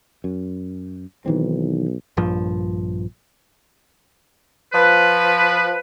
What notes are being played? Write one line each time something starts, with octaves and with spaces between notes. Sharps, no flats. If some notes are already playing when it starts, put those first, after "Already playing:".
F#2
B1 D#3 E3 C4
A#1 G2 F3
F3 B4